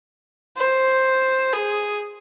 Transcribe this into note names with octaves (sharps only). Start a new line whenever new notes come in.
C5
G#4